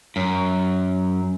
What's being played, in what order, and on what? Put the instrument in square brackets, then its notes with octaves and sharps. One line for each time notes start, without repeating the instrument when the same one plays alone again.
[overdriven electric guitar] F#2